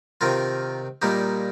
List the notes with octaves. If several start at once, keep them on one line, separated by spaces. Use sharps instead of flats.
C3 D#3 C4 F4 A#4
A#2 G3 A#3 D#4 G4